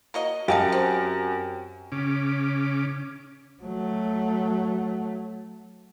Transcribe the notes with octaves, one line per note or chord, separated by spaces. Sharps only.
A#3 F#4 D#5
F#2 G4 A4 D#5 F5
C4
C#3 C#4 D6
F#3 A3